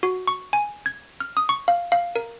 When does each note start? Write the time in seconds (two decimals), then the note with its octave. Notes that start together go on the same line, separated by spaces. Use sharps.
0.03 F#4
0.27 C#6
0.53 G#5
0.86 G#6
1.20 F6
1.37 D#6
1.49 C#6
1.68 F5
1.92 F5
2.16 A#4